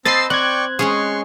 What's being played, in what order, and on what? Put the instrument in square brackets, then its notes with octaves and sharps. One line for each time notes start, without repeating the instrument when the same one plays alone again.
[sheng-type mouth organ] C4 A5 E6 [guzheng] C5 D#5 B5 [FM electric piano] A6 C7
[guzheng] C4 [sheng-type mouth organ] D5 G5 C#6 [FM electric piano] F#6 G#6
[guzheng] G#3 C#4 G#4 [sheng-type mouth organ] C6 C#6